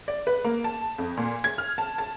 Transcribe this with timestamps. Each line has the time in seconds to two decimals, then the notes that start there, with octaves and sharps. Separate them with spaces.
0.08 D5
0.27 B4
0.44 A#3
0.64 A5
0.98 F2
1.17 A#2
1.44 G#6
1.58 F6
1.78 A5
1.98 A5